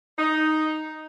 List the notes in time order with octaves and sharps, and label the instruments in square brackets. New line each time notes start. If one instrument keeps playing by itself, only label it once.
[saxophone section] D#4